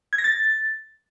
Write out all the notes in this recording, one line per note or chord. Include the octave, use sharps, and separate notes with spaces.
G#6
A#6
A6